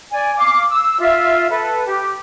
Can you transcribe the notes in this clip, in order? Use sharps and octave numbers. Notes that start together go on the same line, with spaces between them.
D5 G#5
F5 D6
E6
F4 E5
A4 B4
G4